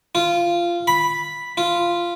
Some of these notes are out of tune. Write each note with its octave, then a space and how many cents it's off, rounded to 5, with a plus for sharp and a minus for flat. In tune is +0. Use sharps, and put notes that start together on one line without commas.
F4 -15
B5 -5
F4 -10